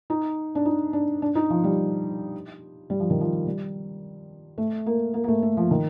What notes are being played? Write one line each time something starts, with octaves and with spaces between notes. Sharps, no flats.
D#4
D4
D#4
D4
D4
D#4
F3
G3
G3
F3
D#3
F3
G3
A3
A#3
A#3
A#3
A3
A3
F3
D#3